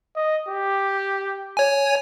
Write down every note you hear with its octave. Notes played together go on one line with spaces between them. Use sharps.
D#5
G4
C#5 G#5